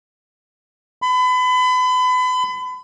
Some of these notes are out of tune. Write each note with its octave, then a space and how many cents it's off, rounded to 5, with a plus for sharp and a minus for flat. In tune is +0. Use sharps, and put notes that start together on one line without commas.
B5 +35